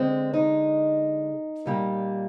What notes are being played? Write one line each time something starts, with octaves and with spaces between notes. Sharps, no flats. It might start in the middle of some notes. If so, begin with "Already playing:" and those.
Already playing: D3 G#3 C4
D#4
A#2 G3 A#3